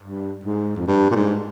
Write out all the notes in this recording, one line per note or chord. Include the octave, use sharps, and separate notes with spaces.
G2
G#2
F2
G2
A#2
G#2